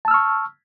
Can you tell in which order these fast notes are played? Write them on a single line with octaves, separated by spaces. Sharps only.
A5 E6 F6 C#6